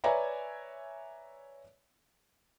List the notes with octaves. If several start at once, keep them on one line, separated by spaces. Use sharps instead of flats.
B4 C#5 D5 E5 G#5 A#5